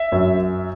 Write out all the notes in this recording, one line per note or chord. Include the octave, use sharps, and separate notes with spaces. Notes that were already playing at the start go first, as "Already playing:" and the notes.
Already playing: E5
F#2